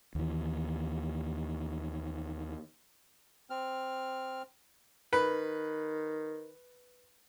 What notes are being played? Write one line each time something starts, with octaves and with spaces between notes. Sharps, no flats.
D#2 E3
C4 F6
D#3 B4